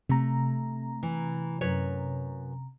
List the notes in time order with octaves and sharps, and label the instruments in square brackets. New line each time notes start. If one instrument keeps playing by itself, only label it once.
[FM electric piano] C3 A#5 [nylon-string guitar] A3
[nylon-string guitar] E3
F#2 B4 C#5